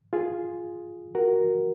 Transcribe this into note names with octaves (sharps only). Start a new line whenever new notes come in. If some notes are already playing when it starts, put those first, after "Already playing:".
F4 G#4
F#4 A#4